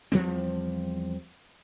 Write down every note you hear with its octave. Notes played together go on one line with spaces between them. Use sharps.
E2 F3 G3 C4